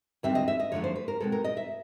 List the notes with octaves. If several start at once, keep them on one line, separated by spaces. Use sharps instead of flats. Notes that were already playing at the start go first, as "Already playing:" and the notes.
D#2 D3 G3 C4 E5
D#5
E5
D#5
F#2 D3 F3 A3 D4 C#5
C5
B4
A#4
B2 G#3 C4 A4
A#4
D#5
E5